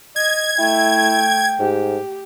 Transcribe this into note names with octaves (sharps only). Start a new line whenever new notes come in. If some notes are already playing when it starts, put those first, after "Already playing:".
D#5 G#6
A3 E4 G5
G#2 G4